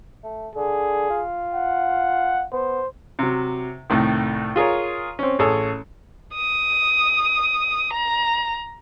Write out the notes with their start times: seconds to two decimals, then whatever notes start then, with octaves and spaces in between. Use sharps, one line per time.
0.23 A3
0.56 D3 G#4
1.10 F4
1.54 F#5
2.52 B3 C5
3.19 C3 F#3
3.90 C2 A2 D#3
4.56 F4 G#4 A#4 C#5
5.19 C4 C#4
5.39 A1 G#4 A4 C#5
6.36 D#6
7.94 A#5